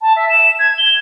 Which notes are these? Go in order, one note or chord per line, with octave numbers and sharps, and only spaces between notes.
A5
E5
E7
G#6
G7